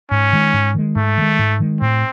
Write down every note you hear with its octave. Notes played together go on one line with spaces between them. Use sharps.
G#2 C#4
D#3 G#3
G#2
D#3 G#3
G#2 A3
D#3 G#3
G#2
D#3 G#3
A2 C4